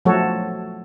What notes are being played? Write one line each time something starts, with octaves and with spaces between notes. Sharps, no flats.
F3 F#3 A3 F#4 A4 C#5